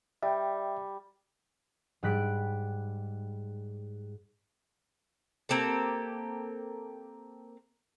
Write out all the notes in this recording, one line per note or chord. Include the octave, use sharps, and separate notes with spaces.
G3 E5 G5
G#2 G3 F#6 B6 D7
A#3 C4 G4 A4